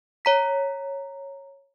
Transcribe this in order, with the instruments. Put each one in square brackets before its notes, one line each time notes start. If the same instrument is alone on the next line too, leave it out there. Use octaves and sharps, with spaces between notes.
[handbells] C#5 A#5 B6